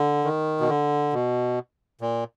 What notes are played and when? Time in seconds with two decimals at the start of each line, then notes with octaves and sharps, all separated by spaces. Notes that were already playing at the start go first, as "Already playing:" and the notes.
Already playing: D3
0.24 D#3
0.60 B2
0.68 D3
1.13 B2
2.01 A#2